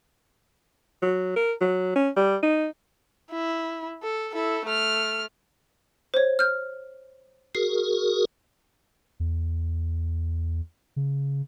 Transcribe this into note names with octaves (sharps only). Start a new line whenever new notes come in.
F#3
A#4
F#3
C#4
G3
D#4
E4
A4
E4 A4
A3 F6
C5 C#5
F6 G6
F#4 G#4 A#4 C7
E2
C#3